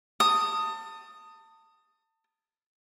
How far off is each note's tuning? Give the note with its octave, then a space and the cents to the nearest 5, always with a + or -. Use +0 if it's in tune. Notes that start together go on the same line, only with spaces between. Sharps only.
A5 +30 D#6 +0